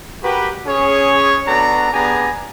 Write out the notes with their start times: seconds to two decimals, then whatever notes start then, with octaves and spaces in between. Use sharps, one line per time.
0.23 F#4 G4 A#4 B4
0.67 C#4 G#4 C#5
1.47 B3 D4 F#4 A4 A#5
1.92 B3 D4 G4 G#4 G#5 A#5